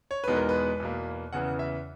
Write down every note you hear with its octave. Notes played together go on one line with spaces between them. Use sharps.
C#5
E2 B2 G#3 B3 D#4 B4
A#4
B4
E2 B2 A#3
E2 C#3 E3 F#5
E5